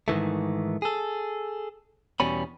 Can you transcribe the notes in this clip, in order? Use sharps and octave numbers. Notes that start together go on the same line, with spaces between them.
G#2 D#3 E3 A3
G#4 A4
E2 B2 G3 C#4 B5